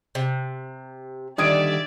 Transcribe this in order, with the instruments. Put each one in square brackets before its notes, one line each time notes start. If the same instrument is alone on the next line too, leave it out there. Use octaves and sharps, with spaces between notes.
[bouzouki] C3
[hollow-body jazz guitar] D3 D#3 G3 [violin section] D5 E5 [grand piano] D#6 G#6 D7